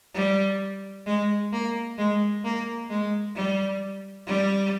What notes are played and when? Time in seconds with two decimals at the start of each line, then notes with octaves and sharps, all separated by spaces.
0.14 G3
1.06 G#3
1.52 A#3
1.98 G#3
2.44 A#3
2.90 G#3
3.35 G3
4.27 G3